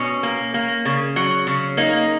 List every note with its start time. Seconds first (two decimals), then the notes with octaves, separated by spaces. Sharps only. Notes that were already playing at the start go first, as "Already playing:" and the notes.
Already playing: B2 C#4
0.23 A#3
0.54 A#3
0.85 C#3
1.16 F#3
1.47 C#3
1.77 A#3 D#4